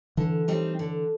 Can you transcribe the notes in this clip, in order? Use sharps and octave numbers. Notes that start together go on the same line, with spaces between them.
D3 E3
G3 C4 D#4
D3